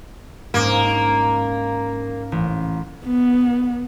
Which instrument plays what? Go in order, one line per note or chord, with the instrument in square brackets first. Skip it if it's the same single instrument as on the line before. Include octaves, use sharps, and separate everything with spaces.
[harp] G#2 G#3 C#4 [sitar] A#3
[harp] C#4
A1
[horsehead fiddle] B3